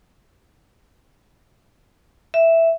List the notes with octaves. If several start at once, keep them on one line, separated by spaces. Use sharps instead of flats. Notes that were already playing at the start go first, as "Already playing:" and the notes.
E5